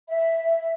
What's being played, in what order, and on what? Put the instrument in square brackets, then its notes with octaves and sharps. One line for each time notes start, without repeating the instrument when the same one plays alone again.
[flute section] E5